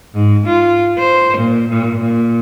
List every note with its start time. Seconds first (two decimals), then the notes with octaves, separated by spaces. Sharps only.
0.14 G#2
0.46 F4
0.99 C5
1.38 A#2
1.69 A#2
1.99 A#2